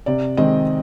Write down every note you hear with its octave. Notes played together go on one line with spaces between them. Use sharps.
C3 D5
D#3 G#3 C4 D#5